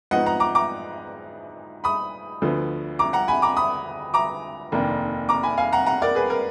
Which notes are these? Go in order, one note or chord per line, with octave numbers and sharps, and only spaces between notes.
G#2 F3 B3 D#4 D#5 F#5
F#5 A#5
A#5 D6
A#5 D6
B5 D#6
D2 D3 F3 B3
A#5 D6
F#5 A#5
G#5 B5
A#5 D6
B5 D#6
A#5 D6
F1 D#2 D#3 A#3 D4
A#5 D6
G#5 B5
F5 G#5
F#5 A#5
F#5 A#5
A#4 D5
G#4 B4
A#4